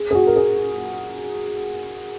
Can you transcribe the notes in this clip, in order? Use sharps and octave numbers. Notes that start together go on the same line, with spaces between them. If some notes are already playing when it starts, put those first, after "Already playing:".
Already playing: G#4
G#4
F#4
A#4
G#4